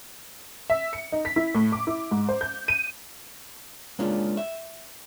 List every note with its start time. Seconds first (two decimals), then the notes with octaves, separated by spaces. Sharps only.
0.70 E5
0.93 C#7
1.12 D#4
1.25 B6
1.36 E4
1.54 A2
1.72 D6
1.87 E4
2.11 G#2
2.29 C5
2.41 G6
2.68 D#7
3.99 G#3 A#3 C#4 D4 F4
4.37 E5